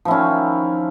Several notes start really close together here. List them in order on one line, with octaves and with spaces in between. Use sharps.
F3 E4 C#4 D#3